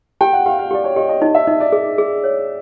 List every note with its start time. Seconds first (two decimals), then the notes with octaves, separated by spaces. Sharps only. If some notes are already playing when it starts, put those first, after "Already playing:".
0.21 G4 G5
0.33 F#5
0.46 G4 F5
0.59 F5
0.71 G4 D5
0.84 C#5
0.96 G4 D#5
1.09 D#5
1.22 D#4 D#5
1.35 E5
1.47 D#4 D#5
1.60 D5
1.72 G#4
1.98 G#4
2.24 C#5